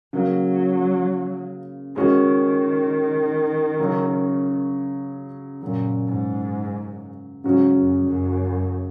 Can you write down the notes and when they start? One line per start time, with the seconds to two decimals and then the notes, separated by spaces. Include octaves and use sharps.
0.13 C#3 F#3 A#3 C#4
1.96 D#3 G#3 C#4 F#4
3.79 C#3 F#3 C#4
5.62 F#2 A#2 C#3 F#3
6.07 G#2
7.44 G#2 C#3 F#3 C#4 F#4
7.75 F#2
8.06 F#2